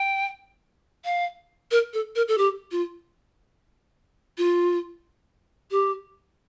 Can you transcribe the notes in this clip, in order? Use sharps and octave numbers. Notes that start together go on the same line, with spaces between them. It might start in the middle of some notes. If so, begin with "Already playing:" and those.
Already playing: G5
F5
A#4
A4
A#4
A4
G4
F4
F4
G4